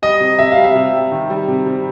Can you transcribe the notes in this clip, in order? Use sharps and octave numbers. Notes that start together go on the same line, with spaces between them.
G3 D#5
C3
C3 E5
F5
G3
E5
C3
G3
D#3
G3
C3
C3